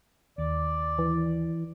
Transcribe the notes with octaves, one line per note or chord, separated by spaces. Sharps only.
D#2 D5
E3